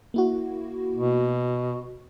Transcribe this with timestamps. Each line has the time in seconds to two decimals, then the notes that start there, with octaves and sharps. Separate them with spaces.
0.14 A#3 E4 F#4
0.94 B2